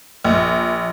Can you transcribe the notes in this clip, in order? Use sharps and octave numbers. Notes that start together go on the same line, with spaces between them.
A#1